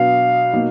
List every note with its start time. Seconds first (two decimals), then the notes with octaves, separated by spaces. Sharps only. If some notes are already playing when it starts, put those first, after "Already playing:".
Already playing: B2 F#3 B3 D4 F5
0.53 B2 F#3 A#3 D#4